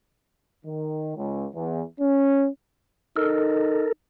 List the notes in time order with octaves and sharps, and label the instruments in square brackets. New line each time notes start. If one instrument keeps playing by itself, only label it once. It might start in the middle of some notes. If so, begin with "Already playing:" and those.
[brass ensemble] D#3
C#2
E2
C#4
[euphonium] D#4 [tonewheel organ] A4 A#4